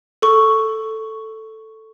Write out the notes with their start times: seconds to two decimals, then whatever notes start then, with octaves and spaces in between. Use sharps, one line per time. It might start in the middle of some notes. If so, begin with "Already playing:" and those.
0.22 A4 C#6